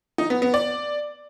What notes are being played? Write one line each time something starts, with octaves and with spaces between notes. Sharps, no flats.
D#4
B3
B3
D5